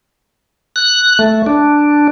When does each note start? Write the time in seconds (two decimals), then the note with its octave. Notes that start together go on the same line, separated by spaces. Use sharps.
0.76 F#6
1.19 A3
1.46 D4